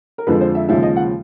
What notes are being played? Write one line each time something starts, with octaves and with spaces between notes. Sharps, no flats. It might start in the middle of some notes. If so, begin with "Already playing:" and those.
A#4
F2 D3 F3 G#3 B4
C5
E5
D#2 C#3 F3 G#3 E5
D#5
F#5